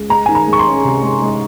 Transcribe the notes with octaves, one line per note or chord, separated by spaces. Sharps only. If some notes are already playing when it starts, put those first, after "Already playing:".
Already playing: C#2
G#3 A#5
D#3 G#5
A#5
G#3
C#6
C6
C#4
C3
G#3
G#3